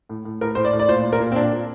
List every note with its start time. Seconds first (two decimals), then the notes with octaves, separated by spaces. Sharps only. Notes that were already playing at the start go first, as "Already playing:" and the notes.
0.09 A2
0.25 A2
0.41 A2 A#4
0.55 A2 C5
0.65 D5
0.73 A2
0.80 D5
0.88 A#2 C5
1.05 A#2
1.13 A#4
1.20 A#2
1.32 C4
1.36 A#2 D4
1.52 A#2